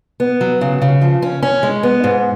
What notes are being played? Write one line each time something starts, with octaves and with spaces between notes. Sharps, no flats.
B3
F#3
C#3
C#3
F3
C#4
C#4
G#3
B3
G#2